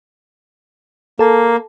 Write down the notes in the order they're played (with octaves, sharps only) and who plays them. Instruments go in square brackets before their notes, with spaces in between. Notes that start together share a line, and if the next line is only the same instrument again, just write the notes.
[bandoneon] A#3 [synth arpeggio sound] A4 A5